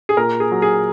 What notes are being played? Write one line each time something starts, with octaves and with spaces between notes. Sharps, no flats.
G#4
A#2 A#4
G#4
F#3
G#4